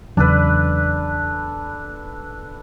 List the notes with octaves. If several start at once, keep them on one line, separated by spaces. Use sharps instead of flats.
E2 C#3 F#3 D4 A4 B4